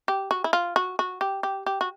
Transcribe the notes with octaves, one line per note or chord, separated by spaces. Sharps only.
G4
F#4
E4
F4
F#4
F#4
G4
G4
G4
F#4